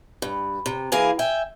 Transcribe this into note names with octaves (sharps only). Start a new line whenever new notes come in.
G2
C3
E3 A#3 G#4 F5 G#5
E5 G5 G#5